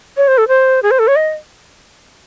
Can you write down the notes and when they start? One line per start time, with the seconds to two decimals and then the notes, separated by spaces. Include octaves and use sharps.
0.17 C#5
0.28 C5
0.38 A4
0.48 C5
0.83 G#4
0.91 C5
0.99 A4
1.08 C#5
1.16 D#5